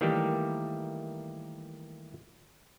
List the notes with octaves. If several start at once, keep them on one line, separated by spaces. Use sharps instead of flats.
D#3 E3 G3 A3 A#3 G4